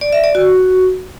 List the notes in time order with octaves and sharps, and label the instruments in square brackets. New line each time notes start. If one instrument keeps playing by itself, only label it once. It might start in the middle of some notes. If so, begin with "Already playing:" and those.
[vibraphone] D5
E5
D5
F#4